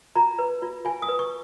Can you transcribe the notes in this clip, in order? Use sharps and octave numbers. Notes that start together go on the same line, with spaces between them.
F4 A#5
B4
F4
F4 G#5
D#6
B4
C#6